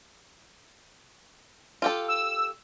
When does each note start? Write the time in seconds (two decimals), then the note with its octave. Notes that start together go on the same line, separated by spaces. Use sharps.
1.82 F4 G4 A4
2.08 E6